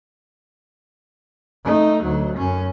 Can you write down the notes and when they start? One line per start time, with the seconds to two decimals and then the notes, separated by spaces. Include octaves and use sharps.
1.65 A3 D#4
2.03 D2 F#3
2.38 F#2 C#4